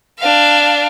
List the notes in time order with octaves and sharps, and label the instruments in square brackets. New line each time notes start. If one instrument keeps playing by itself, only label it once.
[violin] D4 F5